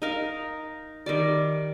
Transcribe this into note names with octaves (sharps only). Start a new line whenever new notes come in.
D#4 A#4 F5
D#3 G3 D5